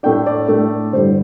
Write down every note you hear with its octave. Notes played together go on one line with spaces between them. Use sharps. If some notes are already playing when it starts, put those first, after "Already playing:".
A2 A3 D4 G5
D5
A2 A3 D4
G2 D3 G3 D4 C5